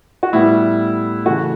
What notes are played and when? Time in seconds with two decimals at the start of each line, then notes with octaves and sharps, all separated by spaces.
0.23 F#4
0.33 A2 G3 B3 E4
1.25 C#3 E3 A3 F#4